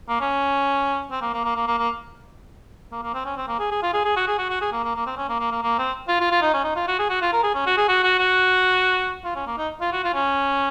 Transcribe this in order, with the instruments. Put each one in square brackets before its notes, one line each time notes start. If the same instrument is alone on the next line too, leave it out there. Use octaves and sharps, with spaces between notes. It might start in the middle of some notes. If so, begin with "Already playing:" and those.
[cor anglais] A#3
C#4
C4
A#3
A#3
A#3
A#3
A#3
A#3
A#3
A#3
C4
C#4
C4
A#3
G#4
G#4
F4
G#4
G#4
F#4
G#4
F#4
F#4
G#4
A#3
A#3
A#3
C4
C#4
A#3
A#3
A#3
A#3
C4
F4
F4
F4
D#4
C#4
D#4
F4
F#4
G#4
F#4
F4
A#4
G#4
C#4
F#4
G#4
F#4
F#4
F#4
F4
C#4
A#3
D#4
F4
F#4
F4
C#4